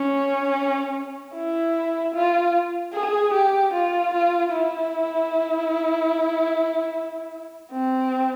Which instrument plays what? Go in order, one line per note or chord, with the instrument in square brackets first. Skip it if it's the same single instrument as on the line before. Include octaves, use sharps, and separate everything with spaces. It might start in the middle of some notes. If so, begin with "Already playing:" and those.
Already playing: [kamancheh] C#4
E4
F4
G#4
G4
F4
F4
E4
C4